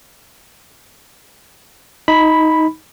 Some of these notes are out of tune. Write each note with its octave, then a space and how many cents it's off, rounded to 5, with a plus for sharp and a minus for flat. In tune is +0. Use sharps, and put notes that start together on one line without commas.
D#4 +15 B5 +0